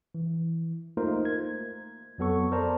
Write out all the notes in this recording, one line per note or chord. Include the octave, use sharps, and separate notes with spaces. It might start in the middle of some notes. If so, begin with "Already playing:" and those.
E3
A3 A#3 D#4 F4 A#4 C5
G#6
F2 F#3 B3 A4 C#6
A#4 C5 D5 A5 A#5